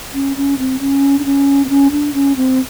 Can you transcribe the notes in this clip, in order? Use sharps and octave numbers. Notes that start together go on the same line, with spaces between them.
C#4
C#4
C4
C#4
D4
C#4
C4
C#4
D4
C#4
C4